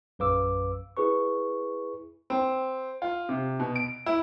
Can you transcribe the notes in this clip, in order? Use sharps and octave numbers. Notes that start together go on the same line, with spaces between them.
A#1 F#2 B4 F5 D6 E6
E4 G#4 B4 C#6
C4
F4
C3
B2
D7
E4